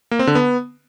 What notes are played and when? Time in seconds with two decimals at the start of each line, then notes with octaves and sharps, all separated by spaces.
0.11 A#3
0.19 C4
0.27 D3
0.35 B3